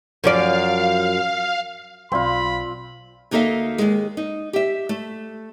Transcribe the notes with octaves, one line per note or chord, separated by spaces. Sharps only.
F#2 F3 D5 F5
B1 C4 F4 D5 F5 B5 C6
D2 A#3 D#4 A4 E5 F5
D#2 G#3
D#4
G4 E5
A3